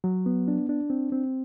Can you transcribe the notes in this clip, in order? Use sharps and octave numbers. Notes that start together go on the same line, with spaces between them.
F#3
B3
D4
D4
C4
C4